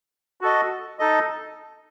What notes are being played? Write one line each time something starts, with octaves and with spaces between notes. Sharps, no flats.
F#4 A4 D#5
D#4 A4 D#5